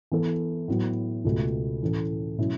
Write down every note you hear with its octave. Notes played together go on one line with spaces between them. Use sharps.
E3 B3 A4
A2 F#3 B3
C#2 B2 A3
A2 E3 C#4 A4
B2 F#3 C#4 E4